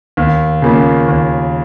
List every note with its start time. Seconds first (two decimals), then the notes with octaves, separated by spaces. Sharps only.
0.17 D#2
0.62 C#3 A#3 F4
1.08 D#2